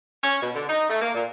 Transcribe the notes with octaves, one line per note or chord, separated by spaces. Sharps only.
C#4
B2
D3
D#4
A3
A#3
A#2